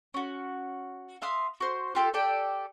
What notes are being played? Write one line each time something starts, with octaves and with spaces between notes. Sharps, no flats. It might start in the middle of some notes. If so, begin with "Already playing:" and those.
C#4 F#4
E5 F5 C6 D#6
F#4 C5
F4 G4 A4
G4 A4 D5 G5